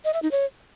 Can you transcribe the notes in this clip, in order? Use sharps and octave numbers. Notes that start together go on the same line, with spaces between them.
D#5
E5
D#4
C#5